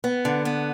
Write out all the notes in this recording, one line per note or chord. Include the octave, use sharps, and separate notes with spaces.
B3
D3
B3